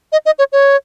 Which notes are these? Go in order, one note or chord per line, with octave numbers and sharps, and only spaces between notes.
D#5
D#5
C#5
C#5